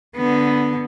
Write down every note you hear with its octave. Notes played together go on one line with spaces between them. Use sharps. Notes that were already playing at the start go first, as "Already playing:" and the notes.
D3 B3